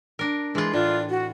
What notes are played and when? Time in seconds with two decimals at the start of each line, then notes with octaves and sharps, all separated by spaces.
0.19 D4 A#4
0.55 E3 G#3 F4
0.74 A2 D4 F4
1.10 F#4